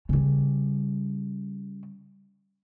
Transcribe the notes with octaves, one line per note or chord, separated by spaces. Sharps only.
C#3 G3